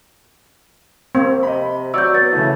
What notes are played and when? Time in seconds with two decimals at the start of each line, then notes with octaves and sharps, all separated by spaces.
1.15 A#3 C4
1.43 C3 D#5 B5
1.94 F#3 F#4 C#5 D5 E6 G6
2.14 B3 A6
2.32 C#3 E3 A3